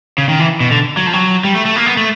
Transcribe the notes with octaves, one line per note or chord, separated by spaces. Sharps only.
C#3
D#3
E3
B2
D3
F#3
F3
F#3
G3
A3
A3
A#3
B3
A3